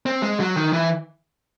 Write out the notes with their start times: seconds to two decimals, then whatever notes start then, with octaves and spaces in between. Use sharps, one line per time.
0.06 C4
0.22 G#3
0.40 F#3
0.56 D#3
0.73 E3